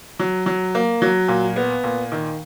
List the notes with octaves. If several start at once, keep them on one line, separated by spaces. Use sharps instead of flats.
F#3
F#3
A#3
F#3
A#2
B3
A#2
D#3